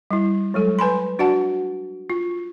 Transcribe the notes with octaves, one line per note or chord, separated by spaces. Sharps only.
G3 E4
F#3 G#3 A4
B4 G#5 B5 C6
D4 F#4 D5 F#5 A5
F4